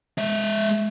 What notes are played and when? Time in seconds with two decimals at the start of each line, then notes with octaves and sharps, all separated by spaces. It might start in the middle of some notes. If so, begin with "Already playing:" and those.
0.18 G#3 E5